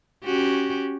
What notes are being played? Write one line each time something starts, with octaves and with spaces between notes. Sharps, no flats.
C#4 F#4 G4